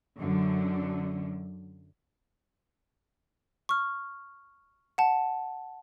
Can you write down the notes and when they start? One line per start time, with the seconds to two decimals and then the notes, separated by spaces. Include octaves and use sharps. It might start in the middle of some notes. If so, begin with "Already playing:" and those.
0.18 F#2 D3
3.69 C#6 F6
4.98 F#5 A5